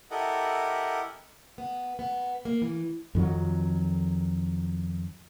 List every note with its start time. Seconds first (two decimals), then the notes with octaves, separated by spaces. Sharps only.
0.11 E4 G4 A4 A#4 D#5 F#5
1.58 B3
1.99 B3
2.45 A#3
2.62 E3
3.15 F2 D#3 F#3